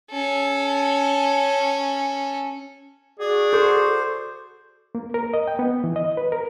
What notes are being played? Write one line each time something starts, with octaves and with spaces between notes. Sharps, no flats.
C#4 A4
F#4 G#4 D5
A4 C5 C#6
A#3
A#4
D#5
G5
B3
E3
D#5
B4
A#4